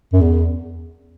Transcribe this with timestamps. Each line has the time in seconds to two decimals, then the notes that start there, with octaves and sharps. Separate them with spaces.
0.13 F#2
0.21 E2